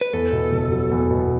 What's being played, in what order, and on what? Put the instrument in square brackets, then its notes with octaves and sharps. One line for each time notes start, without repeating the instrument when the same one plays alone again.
[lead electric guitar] B4
[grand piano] E2 [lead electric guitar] A4
[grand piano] B2
F#1
F#3
E2
B2